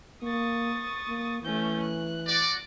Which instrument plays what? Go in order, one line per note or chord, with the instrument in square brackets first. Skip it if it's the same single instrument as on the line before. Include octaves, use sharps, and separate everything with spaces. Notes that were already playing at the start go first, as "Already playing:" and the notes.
[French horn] A#3 [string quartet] C#6 D#6 A6
[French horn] A#3
[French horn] E3 [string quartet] A3 C#4 G6
[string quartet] F#6
[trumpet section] F#4 D5